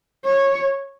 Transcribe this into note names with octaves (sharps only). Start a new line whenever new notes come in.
C#5